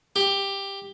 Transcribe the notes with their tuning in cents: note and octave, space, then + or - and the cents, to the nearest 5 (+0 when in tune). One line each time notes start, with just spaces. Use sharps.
G4 +10